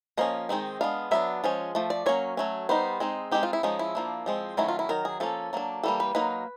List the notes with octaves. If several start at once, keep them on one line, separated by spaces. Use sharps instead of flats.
F3 A#3 C#4 D#5
D#3 G#3 C4 D#4
G#3 B3 D4 F5
F#3 B3 D4 E5
F3 G#3 C#4
F3 A3
D5
F#3 A#3 C#4 C#5
F#3 A3 C#4
G3 B3 D#4 C5
G#3 C4 D#4
G#3 C4 D#4 G4
F4
E4
F3 G#3 C#4 D#4
E4
F3 A#3 D4
F3 G#3 C4
D#3 F#3 A3 C#4 E4
F4
E4
D#3 F#3 A#4
G#4
F3 A#3 C#4 A4
F#3 A#3 D4
E3 G3 A#3 A4
B4
F#3 A#3 D#4 B4